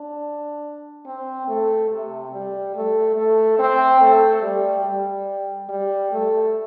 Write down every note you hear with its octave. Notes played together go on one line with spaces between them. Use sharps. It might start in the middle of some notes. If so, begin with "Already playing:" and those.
Already playing: D4
C4
A3
C3
G3
A3
A3
C4
A3
G3
G3
G3
A3